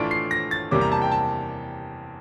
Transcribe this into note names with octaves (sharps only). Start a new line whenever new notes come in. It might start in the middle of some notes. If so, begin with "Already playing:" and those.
Already playing: A2 E3 A3 D4 F4 D7
C7
A#6
A6
E2 C3 G3 A#3 D6
A#5
A5
G5
A5